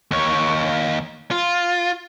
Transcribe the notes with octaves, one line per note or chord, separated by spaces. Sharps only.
D#2 C#5
F4